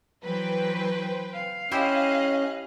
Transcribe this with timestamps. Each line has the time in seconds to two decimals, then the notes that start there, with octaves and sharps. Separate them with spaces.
0.24 E3 F#3 B4 C5 G5
1.34 F5
1.71 C#4 E4 G4 C5 D#5 G#5 F#6